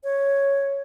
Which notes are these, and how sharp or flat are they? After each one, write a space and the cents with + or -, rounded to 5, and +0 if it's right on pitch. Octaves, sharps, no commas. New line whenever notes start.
C#5 +0